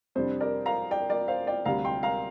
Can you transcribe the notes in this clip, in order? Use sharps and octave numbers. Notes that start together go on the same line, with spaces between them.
F2 C3 G3 D4 C5
A#4 D5
F5 A#5
D5 G5
A#4 D5
C5 F5
D5 G5
D2 C3 G3 F5 A#5
G5 C6
F5 A#5